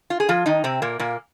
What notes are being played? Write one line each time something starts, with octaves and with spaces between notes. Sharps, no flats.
F4
G#4
F3 F4
D#3 D#4
C3 C4
A#2 A#3
A#2 A#3